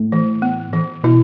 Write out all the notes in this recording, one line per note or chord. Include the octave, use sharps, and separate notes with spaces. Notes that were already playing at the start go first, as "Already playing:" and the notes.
Already playing: A2
E3
B3
E3
B2 E4